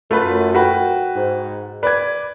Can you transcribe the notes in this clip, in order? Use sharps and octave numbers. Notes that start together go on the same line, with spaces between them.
F#2 A3 F4 B4
F#4 B4 G5
G#2
B4 D5 G#6